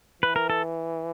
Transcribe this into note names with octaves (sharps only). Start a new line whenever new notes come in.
E3 B4
A#4
A4